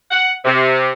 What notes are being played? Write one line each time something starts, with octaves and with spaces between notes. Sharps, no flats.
F#5
C3